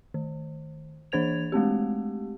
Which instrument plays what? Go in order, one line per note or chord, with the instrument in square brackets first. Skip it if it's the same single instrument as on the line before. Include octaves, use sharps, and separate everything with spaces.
[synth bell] D#3
E3 D4 C5 G#6 F7
G#3 A3 C4 G4